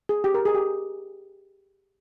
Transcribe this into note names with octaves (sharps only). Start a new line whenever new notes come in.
G#4
G4
A#4
G#4
G4